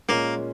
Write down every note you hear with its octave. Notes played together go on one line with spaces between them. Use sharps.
A#2 G#3 A#3 C#4